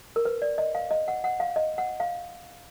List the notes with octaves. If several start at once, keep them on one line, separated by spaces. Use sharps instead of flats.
A#4
B4
D5
D#5
F5
D#5
F#5
F#5
F5
D#5
F#5
F5